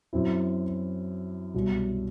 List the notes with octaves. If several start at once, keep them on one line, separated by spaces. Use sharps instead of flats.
F#2 F#3 C4 E4
C2 B2 F#3